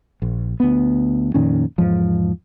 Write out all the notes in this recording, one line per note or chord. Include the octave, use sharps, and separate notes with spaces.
A#1
D2 B3
F2 A#2 D#3 C#4
E2 G#2 F3